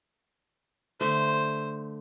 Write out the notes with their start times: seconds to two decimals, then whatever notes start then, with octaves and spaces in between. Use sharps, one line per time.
1.01 D3 A3 C5